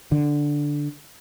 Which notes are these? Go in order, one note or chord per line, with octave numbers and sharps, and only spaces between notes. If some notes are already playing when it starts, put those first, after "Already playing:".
D3